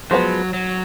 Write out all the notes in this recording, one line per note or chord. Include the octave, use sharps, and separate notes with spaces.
F3 F#3 G#3 B3 F#4 B4
F#3